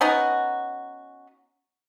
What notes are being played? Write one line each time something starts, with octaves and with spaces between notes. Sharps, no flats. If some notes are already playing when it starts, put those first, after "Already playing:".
B3 C#4 D#4 F#4